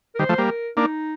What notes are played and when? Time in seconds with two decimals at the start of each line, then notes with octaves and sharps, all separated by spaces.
0.15 A#4
0.19 D#3 G3 C5
0.29 F3 A3
0.38 G3 A#3
0.48 A#4
0.77 A#3 D4 D#4